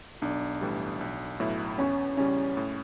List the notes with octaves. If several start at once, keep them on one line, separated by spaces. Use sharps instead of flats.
B1 D4
A2 E3 G3
B1
A2 F#3 B3 E4
E2 C#4
C#3 G3 C#4
A2